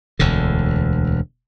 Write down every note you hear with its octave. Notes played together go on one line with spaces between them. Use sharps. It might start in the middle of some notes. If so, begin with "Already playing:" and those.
E1 D2 D3